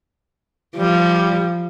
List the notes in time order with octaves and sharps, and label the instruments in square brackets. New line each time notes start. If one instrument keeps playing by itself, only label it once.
[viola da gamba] F3 [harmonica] G3